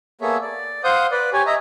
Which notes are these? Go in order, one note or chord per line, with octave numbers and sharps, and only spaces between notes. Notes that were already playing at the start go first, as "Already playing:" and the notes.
A#3 B3 G#4 A4 C#5 E5
D5
C5 F5 F#5 D#6 G6
B4 D5
G4 C#5 G#5
D#5 E5 A#5